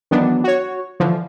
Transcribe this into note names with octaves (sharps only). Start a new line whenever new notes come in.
D#3 E3 F#3 B3 D4
F#4 C#5
D3 E3 F3